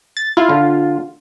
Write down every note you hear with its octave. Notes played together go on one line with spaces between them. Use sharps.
A6
E4 F4
D3